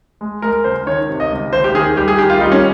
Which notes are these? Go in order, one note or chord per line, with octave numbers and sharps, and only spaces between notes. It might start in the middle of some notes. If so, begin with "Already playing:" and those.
G#3
G#3 A#4
C#2 C5
D#3 C#5
C3
D#5
C#2
D#2 C5
G4
D#3 G#4
G3 G4
G#4
D#3 G4
F4
G3 D#4
C#4